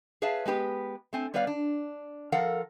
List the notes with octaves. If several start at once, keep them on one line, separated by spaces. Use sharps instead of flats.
G#4 B4 C#5 E5 F5 A5
G#3 B3 G4 B4
A3 C4 G#5
G3 B3 B4 C#5 D5 F5
D4
F3 A4 A#4 F5 F#5